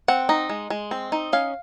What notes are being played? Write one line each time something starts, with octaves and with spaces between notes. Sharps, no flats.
C4 F#5
D#4
G#3
G#3
C4
D#4
C#4 F5